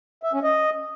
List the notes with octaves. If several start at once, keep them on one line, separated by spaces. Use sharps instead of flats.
E5
C#4
D#5